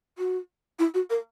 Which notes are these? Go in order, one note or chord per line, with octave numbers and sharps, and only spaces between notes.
F#4
E4
F#4
A#4